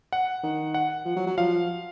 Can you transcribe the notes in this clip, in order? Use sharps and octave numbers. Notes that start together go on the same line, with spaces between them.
F#5
D#3
F#5
F3
F#3
F#3
F3 F5